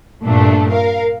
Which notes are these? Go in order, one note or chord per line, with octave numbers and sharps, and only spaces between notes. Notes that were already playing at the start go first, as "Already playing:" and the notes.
G2 A#2 A3 D4
A#4 F5